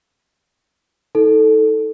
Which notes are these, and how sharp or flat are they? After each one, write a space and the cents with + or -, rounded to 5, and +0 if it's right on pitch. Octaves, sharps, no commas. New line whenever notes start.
D#4 +40 A4 +0